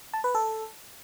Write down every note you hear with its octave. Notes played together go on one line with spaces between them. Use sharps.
A5
B4
A4